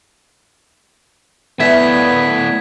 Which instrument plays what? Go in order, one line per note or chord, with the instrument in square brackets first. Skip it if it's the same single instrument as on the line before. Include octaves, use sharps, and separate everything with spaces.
[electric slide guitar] A3 E4 D5 [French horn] B3 [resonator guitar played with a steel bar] E5 [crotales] G#6 B6